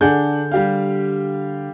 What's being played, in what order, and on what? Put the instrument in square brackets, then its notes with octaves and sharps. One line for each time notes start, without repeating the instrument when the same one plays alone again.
[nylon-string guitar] D3 G#4 [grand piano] D4 F#5 G6
[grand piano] G3 G4 F5